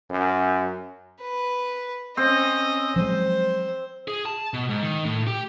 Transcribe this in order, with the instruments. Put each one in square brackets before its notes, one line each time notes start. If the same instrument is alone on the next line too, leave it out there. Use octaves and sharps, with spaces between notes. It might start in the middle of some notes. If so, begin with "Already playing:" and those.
[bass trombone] F#2
[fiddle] B4
[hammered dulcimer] C4 [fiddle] C#4 D#5
[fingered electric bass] F3 F#3 G#3 [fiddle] C5
[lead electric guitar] G#4
A5
B2
G#2
D#3
A2
G4